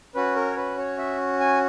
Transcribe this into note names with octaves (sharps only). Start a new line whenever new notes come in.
C#4 F#4 B4
A#4
C#5
B4
C#5
E5
G#5